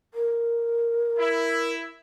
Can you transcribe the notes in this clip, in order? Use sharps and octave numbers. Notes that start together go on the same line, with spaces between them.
A#4
E4